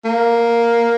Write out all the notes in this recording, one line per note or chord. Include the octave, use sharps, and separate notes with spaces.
A#3